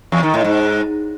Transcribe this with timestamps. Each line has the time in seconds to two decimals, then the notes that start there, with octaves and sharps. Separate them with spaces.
0.12 E2
0.23 D#3
0.34 A2
0.44 G#2